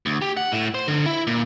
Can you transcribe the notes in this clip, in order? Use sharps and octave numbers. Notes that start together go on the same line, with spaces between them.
D2
G4
F#5
A2
C5
D3
E4
A#2